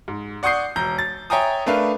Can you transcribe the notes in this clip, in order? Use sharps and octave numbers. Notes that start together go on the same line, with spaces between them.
G#2
D5 F#5 C#6 D#6 G6 C7
E1 A#5 G6
A6
C#5 E5 G5 G#5 A#5 D#6
A3 D4 A#4 B4 E5 F5